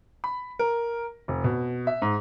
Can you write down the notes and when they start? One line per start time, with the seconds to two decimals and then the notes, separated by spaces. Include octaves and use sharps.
0.24 B5
0.59 A#4
1.28 F1
1.44 B2
1.87 E5
2.02 G#2